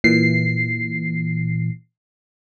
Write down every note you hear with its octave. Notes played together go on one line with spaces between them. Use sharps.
A#2 E3 C7